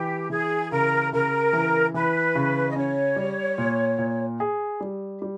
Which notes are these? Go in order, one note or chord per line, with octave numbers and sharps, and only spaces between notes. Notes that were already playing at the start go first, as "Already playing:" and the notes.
Already playing: E3 G4
E3 G#4
C#3 A#4
C#3 A#4
E3
E3 B4
C#3
D#5
C#4 C#5
G3
A#2
A#2
G#4
G3
G3